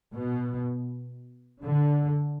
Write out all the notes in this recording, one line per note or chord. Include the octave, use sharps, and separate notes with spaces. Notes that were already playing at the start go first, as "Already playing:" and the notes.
B2
D3